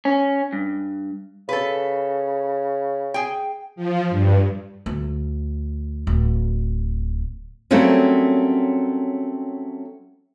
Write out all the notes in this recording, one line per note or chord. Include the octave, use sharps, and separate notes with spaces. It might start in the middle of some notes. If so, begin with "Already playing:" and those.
C#4
G2
C#3 A4 B4
G#4 G5
F3
G2
D2
D1
F#3 G3 A3 A#3 C4 C#4